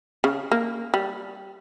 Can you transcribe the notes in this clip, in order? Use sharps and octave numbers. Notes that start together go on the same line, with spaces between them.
C#3
A#3
G3